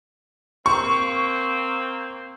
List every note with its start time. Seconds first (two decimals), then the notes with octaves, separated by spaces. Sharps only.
0.66 A#3 C4 C#6